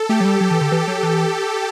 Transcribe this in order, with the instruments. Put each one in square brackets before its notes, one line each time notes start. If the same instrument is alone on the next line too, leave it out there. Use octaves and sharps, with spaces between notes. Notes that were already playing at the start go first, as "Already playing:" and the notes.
Already playing: [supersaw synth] A4
[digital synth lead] A3 [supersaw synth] G4
[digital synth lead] F#3
G3
F#3
E3
D3
E3
F#3
E3